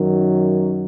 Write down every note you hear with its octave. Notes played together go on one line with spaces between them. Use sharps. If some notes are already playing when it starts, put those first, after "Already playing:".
Already playing: F#2 D#3 F#3